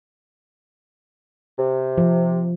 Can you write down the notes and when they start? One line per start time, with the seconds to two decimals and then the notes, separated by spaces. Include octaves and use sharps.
1.59 C3
1.98 F3